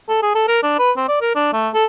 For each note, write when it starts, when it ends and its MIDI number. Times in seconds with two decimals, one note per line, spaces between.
0.09 0.21 69
0.23 0.35 68
0.35 0.48 69
0.48 0.61 70
0.63 0.74 62
0.79 0.91 71
0.97 1.05 60
1.09 1.17 74
1.21 1.34 70
1.35 1.53 62
1.53 1.69 57
1.74 1.85 69